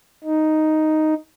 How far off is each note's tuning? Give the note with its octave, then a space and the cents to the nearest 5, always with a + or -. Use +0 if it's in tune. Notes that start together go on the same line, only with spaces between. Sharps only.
D#4 +0